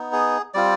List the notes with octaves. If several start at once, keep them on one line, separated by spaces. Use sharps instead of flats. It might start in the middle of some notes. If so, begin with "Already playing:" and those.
Already playing: B3 D#4
G#4
G3 C4 F4 D5